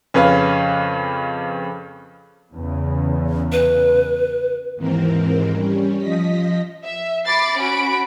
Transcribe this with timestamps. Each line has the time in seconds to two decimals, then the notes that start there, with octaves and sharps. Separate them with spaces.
0.14 F2 C#3 C#4 B4 F5
2.53 E2 C#3
3.52 B4
4.76 D#2 G#2 E3 C4 A#4
5.54 G3 C#4
5.97 F3 D#5 A#6 B6
6.85 E5
7.26 B5 D6 A6 C7
7.60 C#4 F#4 B5 D7